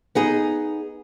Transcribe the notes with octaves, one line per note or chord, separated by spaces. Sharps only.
B3 D#4 G#4